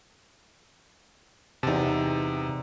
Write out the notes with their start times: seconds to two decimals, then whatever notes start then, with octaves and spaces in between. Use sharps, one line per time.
1.63 E2 C3 D#4 A5